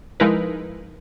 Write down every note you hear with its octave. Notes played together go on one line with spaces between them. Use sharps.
F3 G#3 D#4 E4 A#4 B4